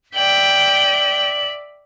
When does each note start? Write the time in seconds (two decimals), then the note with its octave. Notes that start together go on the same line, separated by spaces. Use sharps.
0.15 D5 E5 G5 F#7